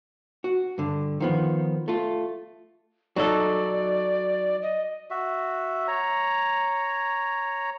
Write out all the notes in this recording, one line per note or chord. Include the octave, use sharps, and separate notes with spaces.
F#4
G2 D3
D#3 F3 B3
A3 F4
F#3 D#4 A4 D5
D#5
F#4 E5
C#5 A#5